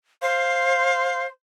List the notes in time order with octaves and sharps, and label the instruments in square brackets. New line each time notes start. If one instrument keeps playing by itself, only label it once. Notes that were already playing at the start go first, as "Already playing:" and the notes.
[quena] C5 [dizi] F5